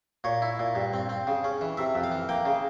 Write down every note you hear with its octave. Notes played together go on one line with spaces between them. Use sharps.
A#2 C#5
E4
A#2
G2
C4
C4
C#3
C#4
E3
C3 E5
F2
F5
E3
A#3 G5
C#3